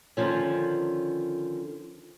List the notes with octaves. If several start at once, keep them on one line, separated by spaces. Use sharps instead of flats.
D3 D#3 F3 C#4